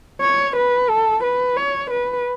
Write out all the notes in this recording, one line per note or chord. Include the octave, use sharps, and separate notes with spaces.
C#5
B4
A4
B4
C#5
B4